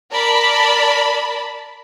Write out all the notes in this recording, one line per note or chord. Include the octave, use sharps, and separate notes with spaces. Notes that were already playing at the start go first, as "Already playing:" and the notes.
A#4 D5 A5 B5